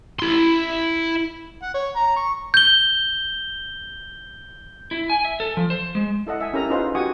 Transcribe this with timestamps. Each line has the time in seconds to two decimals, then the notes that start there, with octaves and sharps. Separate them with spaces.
0.20 E4 C6
1.62 F#5
1.74 C#5
1.96 A#5
2.17 C#6
2.54 G6 G7
4.91 E4
5.10 G#5
5.25 E5
5.40 A4
5.57 F3
5.70 C5
5.95 G#3
6.27 E4 A4 D#5 F#5
6.40 E5 G#5
6.53 C#4 E4 G4 A4 A#4 A#5
6.70 D#4 F4 G#4 B4 C5 D#5
6.95 F#4 G4 F#5 G#5 C#6 D#6